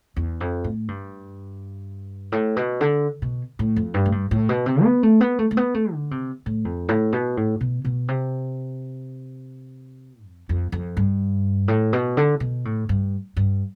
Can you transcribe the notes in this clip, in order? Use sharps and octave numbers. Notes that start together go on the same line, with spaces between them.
E2
F2
A2
G2
A2
B2
D3
B2
A2
F2
G2
A2
G2
A2
B2
C3
B3
A3
B3
A3
A3
B3
A3
D3
C3
A2
F2
A2
B2
A2
B2
B2
C3
F2
F2
F2
G2
A2
B2
D3
B2
A2
G2
G2